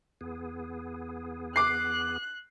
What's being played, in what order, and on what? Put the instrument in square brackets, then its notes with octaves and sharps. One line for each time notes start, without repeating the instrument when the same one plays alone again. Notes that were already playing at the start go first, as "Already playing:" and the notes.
[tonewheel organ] E2 B3 G#4
[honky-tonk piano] D6 C7 [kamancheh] F#6